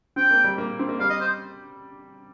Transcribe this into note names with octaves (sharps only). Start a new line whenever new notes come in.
C4 G5
A#3
G3
A#3
C4
A#3
G3 F5
D#5
C5